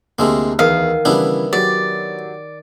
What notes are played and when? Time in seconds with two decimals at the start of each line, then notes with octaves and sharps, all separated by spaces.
0.19 D2 C3 G#3 A#3 E6
0.59 E2 D#3 F5
1.05 C#3 E3 G3 B3 D4 E4
1.53 F#3 G4 D5